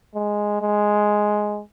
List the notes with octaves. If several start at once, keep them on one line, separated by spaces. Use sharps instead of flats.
G#3
G#3